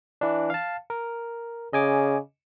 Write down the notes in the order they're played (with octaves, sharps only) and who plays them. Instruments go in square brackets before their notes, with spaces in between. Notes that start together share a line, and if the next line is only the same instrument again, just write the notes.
[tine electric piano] E3 D4
F5 A5
A#4
[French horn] C#3 [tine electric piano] D#5 G#5 D6